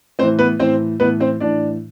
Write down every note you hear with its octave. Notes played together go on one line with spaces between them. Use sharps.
A2 E3 C4 C5
B3 B4
A2 E3 C4 C5
A2 E3 B3 B4
C4 C5
A2 E3 D4 D5